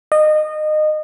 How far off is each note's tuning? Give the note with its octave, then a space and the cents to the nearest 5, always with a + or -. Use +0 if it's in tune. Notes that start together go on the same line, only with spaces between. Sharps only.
D#5 -25